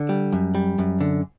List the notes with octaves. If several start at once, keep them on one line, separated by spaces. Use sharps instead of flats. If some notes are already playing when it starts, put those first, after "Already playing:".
Already playing: D3
G3
F#2
G3
F#2
D3